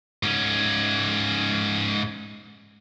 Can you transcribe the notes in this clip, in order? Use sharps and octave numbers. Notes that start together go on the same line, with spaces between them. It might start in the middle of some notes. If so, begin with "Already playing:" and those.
G#2 C#4